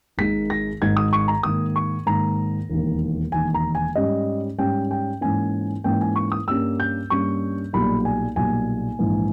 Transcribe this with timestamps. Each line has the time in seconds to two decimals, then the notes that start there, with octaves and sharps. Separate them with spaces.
0.18 G#1 G#2 D#3 G#3 D#4 B6
0.50 A#6
0.81 G#1 G#2 D#3 G#3 D#4 G#6
0.97 D#6
1.13 C#6
1.28 A#5
1.43 G#2 D#3 A#3 D#6
1.76 C#6
2.06 G#2 D#3 A#3 A#5
2.70 E1 D#2 D#3
3.32 E1 D#2 D#3 G#5
3.54 A#5
3.75 G#5
3.96 G#2 G3 C#4 D#5
4.58 G#2 G3 C#4 G5
4.91 G5
5.21 G#2 E3 A#3 C#4 G#5
5.84 G#2 E3 A#3 C#4 G5
6.01 G#5
6.16 C#6
6.32 D#6
6.47 G2 G3 A#3 C#4 E6
6.80 G6
7.10 G2 G3 A#3 C#4 C#6
7.73 B1 A#2 G3 B5
8.05 G#5
8.36 B1 A#2 G3 G#5
8.99 A#1 G#2 E3